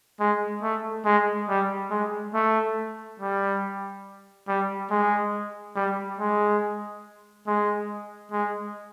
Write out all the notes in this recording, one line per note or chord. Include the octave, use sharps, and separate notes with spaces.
G#3
A3
G#3
G3
G#3
A3
G3
G3
G#3
G3
G#3
G#3
G#3